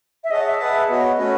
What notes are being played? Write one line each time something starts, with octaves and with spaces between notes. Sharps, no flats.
E5
G#4 C#5 D#5 F#5 A5
E5
G#4 B4 F#5 A5
B3 F#4 C#5 D#5
A3 C#4 F#4 B4